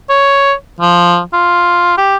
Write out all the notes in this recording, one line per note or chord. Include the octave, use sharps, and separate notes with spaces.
C#5
F3
F4
G4